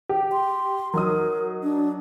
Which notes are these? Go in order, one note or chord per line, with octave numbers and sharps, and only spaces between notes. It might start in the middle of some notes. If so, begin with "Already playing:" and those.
G4
C6
F#3 D#4 A#4 D#6
D4